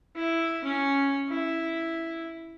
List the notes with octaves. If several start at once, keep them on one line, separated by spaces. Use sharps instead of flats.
E4
C#4
E4